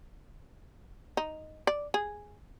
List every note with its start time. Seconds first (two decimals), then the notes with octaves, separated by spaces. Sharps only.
1.17 D#4
1.67 D5
1.94 G#4